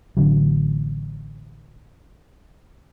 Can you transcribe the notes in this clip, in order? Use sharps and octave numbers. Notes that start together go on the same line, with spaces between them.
A1 D3 F#3